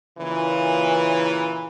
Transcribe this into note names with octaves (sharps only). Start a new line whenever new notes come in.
A#2 C#3 E3